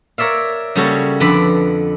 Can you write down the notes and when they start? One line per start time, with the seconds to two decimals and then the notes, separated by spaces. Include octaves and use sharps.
0.18 A#4 C#5 D5 E5 F5
0.75 C#3 G3 A#3 F#4 A4 C#5
1.20 F2 D3 B4 D5 B5